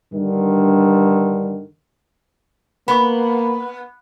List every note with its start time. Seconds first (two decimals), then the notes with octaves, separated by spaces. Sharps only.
0.12 G2 D3 D#3
2.88 A#3 B3 B5 C#6